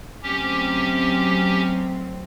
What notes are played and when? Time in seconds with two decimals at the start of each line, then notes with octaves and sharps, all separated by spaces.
0.23 F#3 A3 C4 C#4 G4